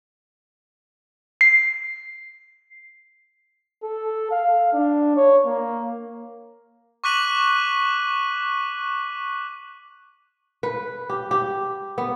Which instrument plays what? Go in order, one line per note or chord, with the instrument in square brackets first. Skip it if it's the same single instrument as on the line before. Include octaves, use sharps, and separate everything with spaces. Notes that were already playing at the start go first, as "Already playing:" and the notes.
[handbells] C7
[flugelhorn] A4
F5
D4
C#5
A#3
[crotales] C#6 D6 F#6 B6 D#7 F#7
[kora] B4
G4
G4
B3